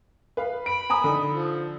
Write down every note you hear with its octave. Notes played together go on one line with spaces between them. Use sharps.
B4 F5
B5 D7
G#5 A#5 D#6
D3 D#4
F3